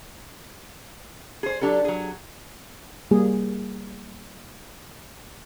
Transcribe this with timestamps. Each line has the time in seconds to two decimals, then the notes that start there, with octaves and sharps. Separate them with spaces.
1.43 G#4 C5
1.61 F#3 D4 G4 A4
1.85 F#3 G#4
3.11 G3 A#3 G#4